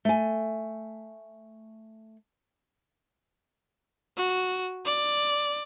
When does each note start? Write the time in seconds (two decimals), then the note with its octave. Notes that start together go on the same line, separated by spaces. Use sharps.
0.05 A3 G#5
4.17 F#4
4.85 D5